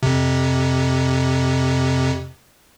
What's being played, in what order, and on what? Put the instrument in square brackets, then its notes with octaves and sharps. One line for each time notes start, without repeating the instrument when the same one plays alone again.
[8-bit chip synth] F2 C3